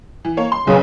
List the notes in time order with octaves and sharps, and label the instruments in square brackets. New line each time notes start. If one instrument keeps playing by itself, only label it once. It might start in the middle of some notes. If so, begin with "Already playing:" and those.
[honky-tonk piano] E3
A#3 C#5
C6
[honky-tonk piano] B1 B4 [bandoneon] C#3